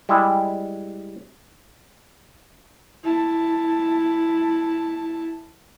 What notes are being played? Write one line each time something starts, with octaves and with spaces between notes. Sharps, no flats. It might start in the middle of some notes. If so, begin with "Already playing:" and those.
G3 G#3 E4
E4 A5